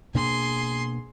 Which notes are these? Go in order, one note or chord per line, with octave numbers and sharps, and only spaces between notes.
B2 A#3 D4 G#4 C6